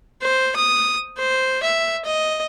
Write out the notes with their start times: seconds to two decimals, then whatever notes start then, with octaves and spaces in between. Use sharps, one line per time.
0.22 C5
0.56 D#6
1.18 C5
1.64 E5
2.05 D#5